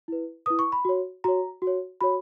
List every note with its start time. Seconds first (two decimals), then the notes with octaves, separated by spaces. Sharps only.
0.08 E4 B4
0.46 E4 B4 D#6
0.59 C#6
0.72 B5
0.85 F#4 C#5
1.24 F#4 C#5 A#5
1.62 F#4
1.67 C#5
2.01 F#4 C#5 B5